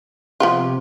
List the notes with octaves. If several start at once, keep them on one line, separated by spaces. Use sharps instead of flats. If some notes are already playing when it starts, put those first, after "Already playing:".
C3 F3 B3 F4